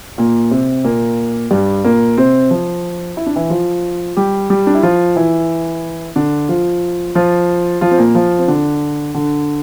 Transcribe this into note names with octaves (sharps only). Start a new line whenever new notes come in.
A#2 A#3
C3 C4
A#2 A#3
G2 G3
A#2 A#3
C3 C4
F3
E4
D4
E3 E4
F3 F4
G3 G4
G3 G4
D4
E4
F3 F4
E3 E4
D3 D4
F3 F4
F3 F4
F3 F4
C4
A#2 A#3
F3 F4
C4
D3 D4
D3 D4